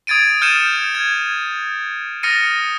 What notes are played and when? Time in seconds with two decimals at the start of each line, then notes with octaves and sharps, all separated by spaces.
0.07 D#6 G#6 A6 D7 D#7
0.42 F6 G6 A6 C#7 D#7 E7
0.95 G#6
2.23 D#6 F6 A6 A#6 C#7 D#7